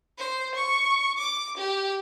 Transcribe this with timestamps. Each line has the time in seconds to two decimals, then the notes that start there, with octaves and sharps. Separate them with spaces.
0.18 C5
0.55 C#6
1.18 D6
1.57 G4